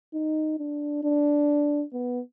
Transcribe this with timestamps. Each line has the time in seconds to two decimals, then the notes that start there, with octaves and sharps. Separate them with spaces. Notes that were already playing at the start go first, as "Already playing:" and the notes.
0.14 D#4
0.59 D4
1.03 D4
1.93 B3